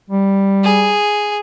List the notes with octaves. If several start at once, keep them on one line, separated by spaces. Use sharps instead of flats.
G3
G#4